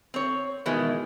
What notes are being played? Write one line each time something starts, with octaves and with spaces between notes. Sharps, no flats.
C4 C#5
B2 D#3 E3 G#3